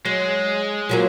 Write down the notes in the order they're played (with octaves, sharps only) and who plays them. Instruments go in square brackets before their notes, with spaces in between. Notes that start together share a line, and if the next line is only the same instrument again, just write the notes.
[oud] F#3 [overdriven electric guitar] G#3
[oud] F3 F#3 A#3